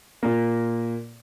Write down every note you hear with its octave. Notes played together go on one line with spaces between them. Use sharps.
A#2 A#3